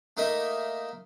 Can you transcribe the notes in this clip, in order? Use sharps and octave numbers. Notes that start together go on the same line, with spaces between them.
A3 A#3 D#4 A#4 D#5 E5